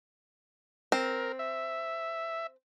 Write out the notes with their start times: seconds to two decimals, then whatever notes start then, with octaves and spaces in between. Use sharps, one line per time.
0.92 C4 A#4
1.39 E5